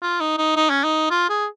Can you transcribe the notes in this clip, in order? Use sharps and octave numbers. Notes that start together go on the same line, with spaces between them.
F4
D#4
D#4
D#4
C#4
D#4
F4
G#4